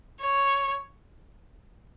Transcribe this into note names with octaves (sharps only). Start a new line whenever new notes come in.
C#5